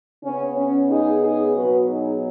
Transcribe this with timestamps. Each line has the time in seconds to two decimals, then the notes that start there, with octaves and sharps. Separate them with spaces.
0.24 C#3 B3 C#4
0.57 C#4
0.89 D#4 G#4
1.23 D#4 G#4
1.55 B2 F#3 B3 F#4 B4
1.88 D#4 G#4